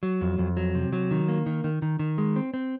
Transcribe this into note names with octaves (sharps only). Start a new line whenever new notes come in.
F#3
F2
F2
F#3
C3
F#3
D#3
A#3
D#3
D#3
D#3
D#3
G#3
C4
C4